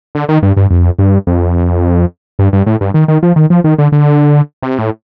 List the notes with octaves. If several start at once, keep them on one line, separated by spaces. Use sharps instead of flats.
D3
D#3
G2
G2
F2
G2
F2
G2
G2
A2
G2
D#3
D#3
F3
D#3
F3
D#3
D3
D3
C3
A2